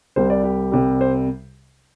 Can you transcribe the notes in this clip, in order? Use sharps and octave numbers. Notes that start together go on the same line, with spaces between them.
C2 C3 G3 C5
D5
G4
C2 C3 G3
C5